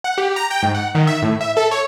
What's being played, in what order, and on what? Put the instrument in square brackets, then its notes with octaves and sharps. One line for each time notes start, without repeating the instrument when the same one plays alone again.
[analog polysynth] F#5
G4
A#5
G5
G#2
F#5
D#3
E5
A2
E5
A4
C#5